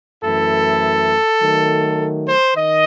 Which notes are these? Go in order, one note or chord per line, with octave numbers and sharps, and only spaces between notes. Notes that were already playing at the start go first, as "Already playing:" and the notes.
F#2 E3 A3 E4 A4
D#3 F#3 A3
C5
D#3 D#5